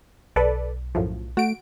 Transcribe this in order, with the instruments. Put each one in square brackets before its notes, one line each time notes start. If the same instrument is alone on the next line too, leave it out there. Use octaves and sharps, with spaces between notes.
[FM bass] B1 [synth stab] A4 B4 D5
[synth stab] F#2 A2 F3
[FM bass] A3 [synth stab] F#4 D7